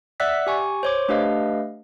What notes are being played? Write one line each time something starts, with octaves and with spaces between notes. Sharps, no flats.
D5 E5 F#5 E6 F#6 B6
G4 G#5 C#6
C5 C#5 D6
A3 D4 G4 B4 D#5 F5